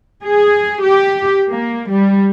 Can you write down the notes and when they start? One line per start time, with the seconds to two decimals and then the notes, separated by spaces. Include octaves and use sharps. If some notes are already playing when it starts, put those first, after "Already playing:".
0.23 G#4
0.83 G4
1.50 A#3
1.91 G3